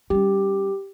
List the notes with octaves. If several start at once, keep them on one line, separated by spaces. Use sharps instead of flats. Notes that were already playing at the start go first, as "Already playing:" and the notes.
G3 C#4 G4